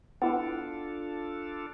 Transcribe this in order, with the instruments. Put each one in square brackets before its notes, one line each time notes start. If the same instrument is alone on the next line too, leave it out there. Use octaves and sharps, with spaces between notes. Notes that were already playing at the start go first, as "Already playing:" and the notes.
[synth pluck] B3 E4 [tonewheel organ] D4 F4 A4